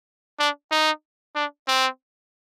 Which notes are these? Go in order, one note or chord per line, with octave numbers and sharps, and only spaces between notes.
D4
D#4
D4
C4